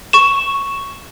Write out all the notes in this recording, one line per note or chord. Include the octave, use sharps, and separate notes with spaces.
C#6 E7